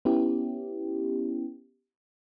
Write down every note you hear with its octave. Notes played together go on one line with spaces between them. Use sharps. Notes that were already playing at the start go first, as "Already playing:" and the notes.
B3 C#4 E4 G4